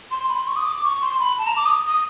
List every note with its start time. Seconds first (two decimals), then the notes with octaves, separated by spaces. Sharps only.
0.11 C6
0.29 B5
0.39 C6
0.47 C#6
0.56 D#6
0.65 D6
0.84 C#6
1.02 C6
1.20 B5
1.38 A5
1.47 A#5
1.56 D6
1.66 D#6
1.87 D#6